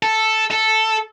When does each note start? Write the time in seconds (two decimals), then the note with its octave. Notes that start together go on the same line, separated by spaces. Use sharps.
0.03 A4
0.51 A4